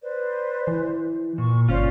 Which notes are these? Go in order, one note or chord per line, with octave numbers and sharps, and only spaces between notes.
B4 C5 D5
E3
A#2 C#6
G1 C#4 F4 C5 D5 F5